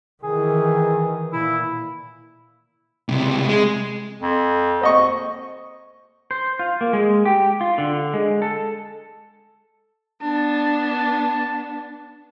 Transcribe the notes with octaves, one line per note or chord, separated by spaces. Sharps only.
D#3 E3 G#4
A#2 E4
C#2 C3
G#3
F2
C5 D#5 C#6
C5
F4
A#3
G#3
G4
F4
D3
G#3
A4
B3 D4 A5